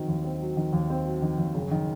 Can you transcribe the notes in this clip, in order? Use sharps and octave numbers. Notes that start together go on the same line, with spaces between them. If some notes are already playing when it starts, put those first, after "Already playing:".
Already playing: D#3 F#3 C4
D#2
C4
F#3
D#3
D#2
C4
F#3
D#3
D#2
F#1
D#3